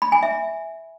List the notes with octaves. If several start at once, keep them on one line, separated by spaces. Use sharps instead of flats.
B5
G#5
E5